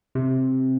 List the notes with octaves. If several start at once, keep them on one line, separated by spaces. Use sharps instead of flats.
C3